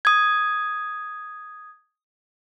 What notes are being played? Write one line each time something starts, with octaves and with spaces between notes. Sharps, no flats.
D#6 G#6